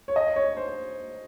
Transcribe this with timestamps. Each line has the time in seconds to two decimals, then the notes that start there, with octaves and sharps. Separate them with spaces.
0.08 C#5
0.16 D#5
0.36 C#5
0.57 C5